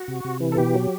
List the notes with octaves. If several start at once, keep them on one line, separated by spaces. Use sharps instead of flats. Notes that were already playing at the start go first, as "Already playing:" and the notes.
Already playing: F#4
C3
C3
E3
A4
B2 G4
F#3